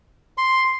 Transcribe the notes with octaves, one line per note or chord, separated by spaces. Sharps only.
C6